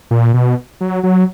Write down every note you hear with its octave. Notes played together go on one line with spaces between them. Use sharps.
A#2
B2
F#3
F#3